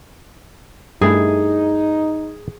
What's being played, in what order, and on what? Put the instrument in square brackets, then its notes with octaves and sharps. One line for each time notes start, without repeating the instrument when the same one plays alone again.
[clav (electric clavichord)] G2 A3 E4 [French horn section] D#4 [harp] G#4